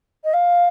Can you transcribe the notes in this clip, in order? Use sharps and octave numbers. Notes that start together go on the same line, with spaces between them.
D#5
F5